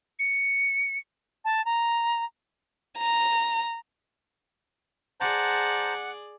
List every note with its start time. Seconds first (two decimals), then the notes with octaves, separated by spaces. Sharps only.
0.19 C#7
1.45 A5
1.65 A#5
2.98 A#5
5.20 G#4 C5 D5 F#5 A5 A#5